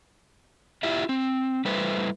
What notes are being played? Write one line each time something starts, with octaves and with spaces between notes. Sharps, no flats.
E4 F4 G4 E5
C4
G3 A3 E4 B4 C5